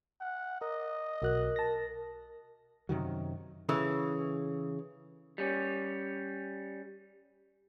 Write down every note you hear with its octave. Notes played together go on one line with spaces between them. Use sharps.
F#5
A#4 D#5
B1 F#4 A#4 F#6
A5 A#6
F#2 C3 D#3 F#3
C#3 E3 A4
G3 C#4